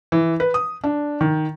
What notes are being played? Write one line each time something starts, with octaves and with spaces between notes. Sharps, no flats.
E3
B4
D#6
D4
D#3